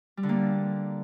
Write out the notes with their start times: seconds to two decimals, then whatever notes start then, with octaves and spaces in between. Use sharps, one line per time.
0.17 G3
0.23 D3
0.29 A#3